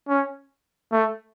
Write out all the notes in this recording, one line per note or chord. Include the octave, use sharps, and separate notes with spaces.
C#4
A3